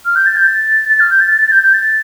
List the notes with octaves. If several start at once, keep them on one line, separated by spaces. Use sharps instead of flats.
F6
G6
A6
G6
A6
A6
F6
G6
A6
A6
A6
G6
G6
A6